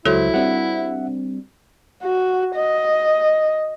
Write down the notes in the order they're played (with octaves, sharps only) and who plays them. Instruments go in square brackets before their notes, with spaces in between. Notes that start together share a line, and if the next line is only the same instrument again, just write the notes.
[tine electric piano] C#2 F#3 C5 [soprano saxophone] E4 [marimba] F#4 A4 C#5
[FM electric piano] G3 C4 D4 [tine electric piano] E5 F#5
[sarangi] F#4
D#5